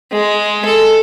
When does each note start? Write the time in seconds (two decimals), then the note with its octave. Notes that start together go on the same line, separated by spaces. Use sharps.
0.12 G#3
0.65 A4